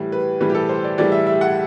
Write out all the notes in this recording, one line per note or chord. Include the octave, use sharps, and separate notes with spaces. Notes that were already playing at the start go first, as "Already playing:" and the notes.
Already playing: A2 E3 G3
B4
A2 E3 G3 B4
G4
A4
C5
D5
A2 E3 G3 D5
E5
E5
F#5